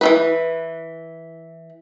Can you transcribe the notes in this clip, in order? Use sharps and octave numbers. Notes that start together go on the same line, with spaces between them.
E3 F3 B4